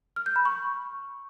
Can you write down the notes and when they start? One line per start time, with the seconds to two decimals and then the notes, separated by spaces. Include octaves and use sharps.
0.16 F6
0.26 G6
0.36 B5
0.45 C#6